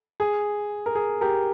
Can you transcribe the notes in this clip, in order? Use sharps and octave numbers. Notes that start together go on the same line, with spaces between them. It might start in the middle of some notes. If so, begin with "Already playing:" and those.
G#4
A#4
G#4
G4 A#4